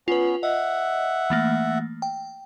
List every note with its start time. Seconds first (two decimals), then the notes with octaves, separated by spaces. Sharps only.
0.08 B3 C#4 F4 B4
0.43 D#5 E5 F#5
1.30 E3 A3 A#3
2.02 G5